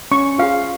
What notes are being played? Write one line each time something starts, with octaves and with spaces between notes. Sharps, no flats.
C#4 C#6
F4 G#4 F5